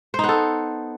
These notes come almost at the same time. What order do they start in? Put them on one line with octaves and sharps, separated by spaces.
C5 D#4 B3 A4